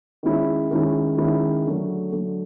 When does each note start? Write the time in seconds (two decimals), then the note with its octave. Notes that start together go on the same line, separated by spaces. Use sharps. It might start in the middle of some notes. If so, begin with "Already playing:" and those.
0.23 D#3 G#3 C#4 E4
0.71 D#3 G#3 C#4 E4
1.17 D#3 G#3 C#4 E4
1.65 D3 F#3 A3
2.12 D3 F#3 A3